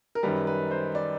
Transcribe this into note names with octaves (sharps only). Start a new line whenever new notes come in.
A#4
F#2 D#3 G3 B4
B4
C5
D5